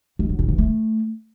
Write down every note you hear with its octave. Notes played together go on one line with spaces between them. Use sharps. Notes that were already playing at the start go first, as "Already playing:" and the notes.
G#3
F#3
A2
E3
A3